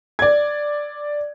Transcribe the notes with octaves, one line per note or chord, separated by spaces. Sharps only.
D5 G#6